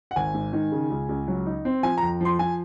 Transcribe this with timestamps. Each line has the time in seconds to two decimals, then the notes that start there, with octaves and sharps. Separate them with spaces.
0.11 F#5
0.16 G#1 G#5
0.34 G#2
0.53 D#3
0.72 C#3
0.90 C#2
1.09 C#2
1.28 F#3
1.46 D#4
1.65 C4
1.83 F3 G#5
1.98 A#5
2.02 F2
2.21 F3 C6
2.39 F3 G#5